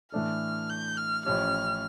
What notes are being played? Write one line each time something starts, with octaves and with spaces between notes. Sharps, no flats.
A2 E3 A3 D4 A4 F6
G6
F6
A1 A2 F3 C#4 G4 F6